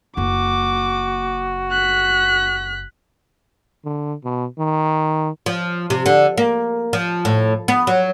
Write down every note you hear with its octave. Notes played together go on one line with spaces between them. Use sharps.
F#1 A#3 F#4 D6
F#6 B6
D3
B2
D#3
F3
C3
D3
A#3
F3
A2
B3
F#3